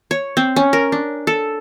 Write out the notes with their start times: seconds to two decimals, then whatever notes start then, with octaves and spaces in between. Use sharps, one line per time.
0.11 C#5
0.37 C4
0.56 C#4
0.73 A#4
0.92 D4
1.27 A4